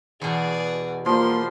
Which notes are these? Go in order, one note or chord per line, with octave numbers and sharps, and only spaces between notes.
E2 B2 G#4 D5
F3 G3 A#3 C6